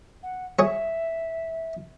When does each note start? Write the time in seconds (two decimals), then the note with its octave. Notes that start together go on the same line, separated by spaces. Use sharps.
0.22 F#5
0.59 G#4 C#5 E5